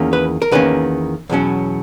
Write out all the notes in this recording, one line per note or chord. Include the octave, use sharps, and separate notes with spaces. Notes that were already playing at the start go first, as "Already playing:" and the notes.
Already playing: E2 D#3 A#3 C#4
B4
A#4
E2 D#3 A#3 C#4 B4
E2 B2 F#3 C#4